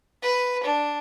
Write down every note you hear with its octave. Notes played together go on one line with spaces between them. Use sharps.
B4
D4